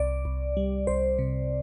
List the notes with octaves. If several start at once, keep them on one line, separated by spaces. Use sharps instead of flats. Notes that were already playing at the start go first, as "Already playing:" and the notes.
Already playing: C2 D5
C2
G3
C2 C5
C3